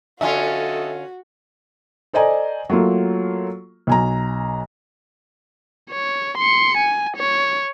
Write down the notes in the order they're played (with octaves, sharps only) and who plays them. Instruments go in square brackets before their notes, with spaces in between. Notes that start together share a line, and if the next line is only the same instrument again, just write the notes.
[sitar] D3 C#4 F4 [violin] F#4 [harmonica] A4 D#5 [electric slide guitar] E5 G#5
[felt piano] A4 C5 D5 D#5 G#5 A#5
F#3 A3 A#3 F4
B1 G#5 A#5
[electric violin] C#5
C6 C#7
G#5
C#5